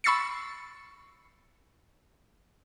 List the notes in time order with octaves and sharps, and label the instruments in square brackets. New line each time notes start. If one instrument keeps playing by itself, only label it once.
[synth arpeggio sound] B5 C#6 E6 A6 C7 C#7